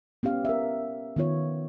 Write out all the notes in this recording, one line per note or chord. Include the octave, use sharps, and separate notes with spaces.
B3 C#4 G4 F5
A#4 E5
D#3 B3 F4 C#5